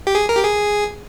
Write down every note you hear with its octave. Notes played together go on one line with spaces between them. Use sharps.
G4
G#4
A#4
G4
G#4